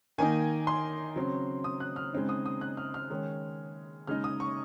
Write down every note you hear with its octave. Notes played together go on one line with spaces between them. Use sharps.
D#3 A#3 D#4 G#5
C6
C#3 F#3 C4
D#6
F#6
F6
C#3 G#3 C4 D#4
D#6
D#6
F#6
F6
F6
D#3 G#3 C#4
C#3 G#3 D#4 F6
D#6
C#6